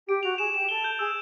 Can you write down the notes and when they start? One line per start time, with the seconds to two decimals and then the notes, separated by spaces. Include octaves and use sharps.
0.08 G4 D7
0.23 F#4 F7
0.38 G#4 E7
0.54 G4 E7
0.69 A4 G7
0.84 G6
0.99 G#4 E6